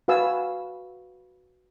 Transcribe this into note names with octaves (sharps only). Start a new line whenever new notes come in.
F#4 B4 F5 G#5 E6